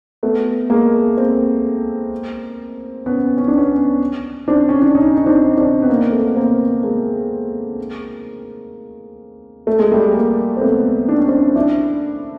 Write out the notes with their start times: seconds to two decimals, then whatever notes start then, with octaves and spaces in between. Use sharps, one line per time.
0.23 A3 B3
0.70 G#3 A#3
1.17 A#3 C4
3.06 B3 C#4
3.38 C#4
3.48 D4
3.58 B3 C#4
4.48 C4 D4
4.69 C#4
4.82 D4
4.95 C#4 D#4
5.17 D#4
5.26 C4 D4
5.57 C4 D4
5.82 B3
5.89 A#3 C4
6.13 A3 B3
6.36 A#3 C4
6.83 G#3 A#3
9.67 A3
9.79 G#3
9.92 G3 A3
10.14 G#3 A#3
10.57 C4
10.61 A3 B3
11.09 D4
11.18 C#4
11.28 C4 D4
11.56 D4 E4